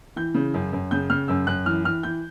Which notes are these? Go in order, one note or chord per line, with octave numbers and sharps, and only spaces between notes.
E3 G6
C#3
F#2
F#2
C#3 G6
C#3 F6
F#2 E6
F#2 F#6
E3 F6
E3 F6
E3 G6